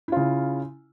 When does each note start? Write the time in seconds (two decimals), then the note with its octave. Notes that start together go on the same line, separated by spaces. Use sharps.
0.08 E4
0.12 F4
0.16 C#3